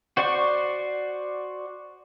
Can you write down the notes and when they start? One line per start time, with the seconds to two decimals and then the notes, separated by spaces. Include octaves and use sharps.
0.17 F#4 C5 D5 F#5 C#6